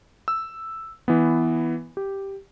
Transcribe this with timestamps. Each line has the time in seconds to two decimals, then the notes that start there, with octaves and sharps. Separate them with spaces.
0.28 E6
1.08 E3 B3
1.97 G4